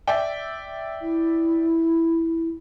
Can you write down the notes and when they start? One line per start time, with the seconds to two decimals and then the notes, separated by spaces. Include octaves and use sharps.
0.07 D5 E5 G5
1.02 E4